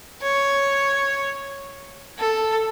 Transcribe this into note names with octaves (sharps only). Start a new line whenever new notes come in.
C#5
A4